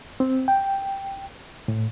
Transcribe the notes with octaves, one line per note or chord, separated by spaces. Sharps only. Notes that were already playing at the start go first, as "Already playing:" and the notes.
C4
G5
A2